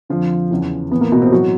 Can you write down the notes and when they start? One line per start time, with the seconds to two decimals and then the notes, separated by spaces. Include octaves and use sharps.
0.09 F2 D3 F3 F4
0.51 E2 C#3 E3
0.91 A2 E3 B3
1.01 A#3
1.12 B2 B3
1.22 C3 C4
1.31 A2 E3 F#3 F#4